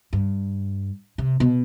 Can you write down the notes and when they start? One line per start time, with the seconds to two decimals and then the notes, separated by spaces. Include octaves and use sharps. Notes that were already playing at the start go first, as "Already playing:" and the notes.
0.13 G2
1.18 C3
1.40 B2